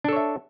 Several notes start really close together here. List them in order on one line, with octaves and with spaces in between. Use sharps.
D4 A4 C#5 E5